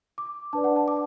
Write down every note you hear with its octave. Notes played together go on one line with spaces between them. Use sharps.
D6
D4 B4 D5 A5
F#5
A5
D6